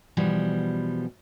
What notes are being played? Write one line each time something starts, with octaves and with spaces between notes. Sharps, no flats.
B2 E3 F3 G3